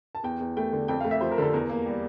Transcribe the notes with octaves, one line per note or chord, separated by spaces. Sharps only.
A5
E2 G5
E2
A3 G5
D3
F2 G5
A3 F5
E5
F3 C5
A#4
D3 A4
E2 A#4
A#3
G3